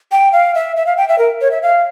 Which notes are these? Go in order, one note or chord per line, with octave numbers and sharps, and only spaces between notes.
G5
F5
E5
E5
F5
G5
E5
A#4
C#5
E5
F5